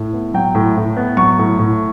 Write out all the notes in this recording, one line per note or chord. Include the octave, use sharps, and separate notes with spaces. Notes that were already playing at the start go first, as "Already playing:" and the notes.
Already playing: A2
B3
F#3 G5
A2
A2
B3
F#3 C#6
A2
A2